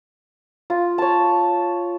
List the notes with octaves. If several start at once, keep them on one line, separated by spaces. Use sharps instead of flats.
F4
C#5 A5